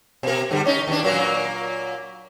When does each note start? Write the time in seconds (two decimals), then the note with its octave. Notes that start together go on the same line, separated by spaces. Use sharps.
0.23 B2 A#4
0.51 G2 D3 G3
0.66 C#4 D#4
0.88 D#2 D4
1.03 A#2 F#3 A#3